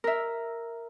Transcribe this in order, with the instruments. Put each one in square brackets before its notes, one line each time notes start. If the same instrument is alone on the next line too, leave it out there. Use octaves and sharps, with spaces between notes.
[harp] A#4 E5